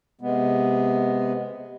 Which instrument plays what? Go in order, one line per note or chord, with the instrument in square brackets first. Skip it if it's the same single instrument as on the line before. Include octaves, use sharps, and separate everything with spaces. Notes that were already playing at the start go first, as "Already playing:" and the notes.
[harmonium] C3 G#3 B3